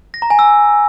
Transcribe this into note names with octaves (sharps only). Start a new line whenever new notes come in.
A#6
A#5
G#5
E6